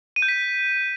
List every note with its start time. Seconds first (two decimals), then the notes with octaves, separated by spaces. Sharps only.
0.16 D#7
0.22 G6
0.28 B6